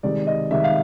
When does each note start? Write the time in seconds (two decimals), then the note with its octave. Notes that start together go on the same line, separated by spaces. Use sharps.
0.03 C3 D#3 G#3 D5
0.27 D#5
0.51 C3 D#3 G#3 E5
0.64 F5